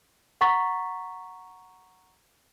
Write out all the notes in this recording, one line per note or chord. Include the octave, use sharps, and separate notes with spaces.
F#5 A#5 C#6 A6 B6